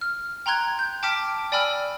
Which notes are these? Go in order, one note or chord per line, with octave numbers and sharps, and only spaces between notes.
F6
G5 A#5 C6 F#6 G#6
G6
G5 A5 D6 F6 B6 D7
D5 G5 G#5 B5 E6 F6